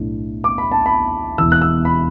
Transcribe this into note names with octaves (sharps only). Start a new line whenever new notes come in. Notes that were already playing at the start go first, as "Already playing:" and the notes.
Already playing: B1 A2 A3 D4
D6
B5
A5
B5
E1 E2 E3 E6
F#6
E6
B5